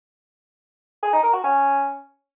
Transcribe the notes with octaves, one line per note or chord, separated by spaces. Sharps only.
G#4
D#4
A#4
F#4
C#4